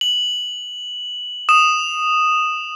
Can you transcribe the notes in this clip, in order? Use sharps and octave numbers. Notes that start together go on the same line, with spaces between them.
F#7
D#6 E7